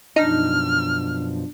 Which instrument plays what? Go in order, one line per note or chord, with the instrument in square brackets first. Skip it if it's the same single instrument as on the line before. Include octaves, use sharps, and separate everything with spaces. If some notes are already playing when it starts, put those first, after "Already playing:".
[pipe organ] F#2 B2 F3 [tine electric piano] D4 [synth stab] D#4 [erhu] F6